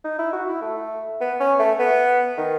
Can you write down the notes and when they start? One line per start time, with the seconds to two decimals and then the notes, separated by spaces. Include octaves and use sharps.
0.04 D#4
0.19 E4
0.33 F#4
0.48 E4
0.62 A3
1.21 B3
1.40 C#4
1.59 A3
1.79 B3
2.38 D#3